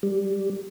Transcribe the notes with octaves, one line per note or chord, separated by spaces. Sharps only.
G3